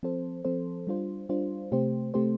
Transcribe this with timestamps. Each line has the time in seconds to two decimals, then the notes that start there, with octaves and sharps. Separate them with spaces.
0.03 F3 C4 A4 C5
0.45 F3 C4 A4 C5
0.87 G3 D4 F4 C5
1.29 G3 D4 F4 C5
1.72 C3 A3 C4 G4 C5
2.14 C3 A3 C4 G4 C5